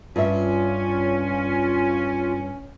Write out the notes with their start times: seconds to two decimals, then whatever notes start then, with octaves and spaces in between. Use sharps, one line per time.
0.16 G2 C#4 F4 E5